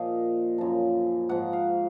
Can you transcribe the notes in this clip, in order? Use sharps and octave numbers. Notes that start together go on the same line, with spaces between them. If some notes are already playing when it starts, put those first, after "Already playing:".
Already playing: A#2 F3 D#5 F5
F#2 F3
G#2 F3 F#5
F5